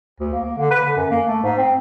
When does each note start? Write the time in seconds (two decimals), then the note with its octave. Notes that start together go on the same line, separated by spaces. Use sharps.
0.20 D2
0.33 A#3
0.46 A#3
0.58 D3
0.71 B4
0.85 D3
0.96 F#2
1.11 A#3
1.28 A3
1.43 G#2
1.58 C4